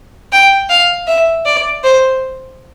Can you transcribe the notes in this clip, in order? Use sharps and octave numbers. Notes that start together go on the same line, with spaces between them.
G5
F5
E5
D5
C5